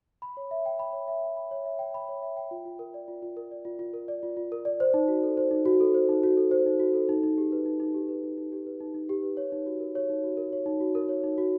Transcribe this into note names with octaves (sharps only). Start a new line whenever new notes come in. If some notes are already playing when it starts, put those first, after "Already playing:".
B5
C#5
E5
G5
B5
C#5
E5
G5
B5
C#5
E5
G5
B5
C#5
E5
G5
F4
F4
A#4
D5
F4
F4
A#4
D5
F4
F4
A#4
D5
F4
F4
A#4
D5
C5
D#4
F#4
A4
C5
D#4
F#4
A4
C5
D#4
F#4
A4
C5
D#4
F#4
A4
D#4
D#4
G4
B4
D#4
D#4
G4
B4
D#4
D#4
G4
B4
D#4
D#4
G4
B4
C#5
D#4
F#4
A#4
C#5
D#4
F#4
A#4
C#5
D#4
F#4
A#4
C#5
D#4
F#4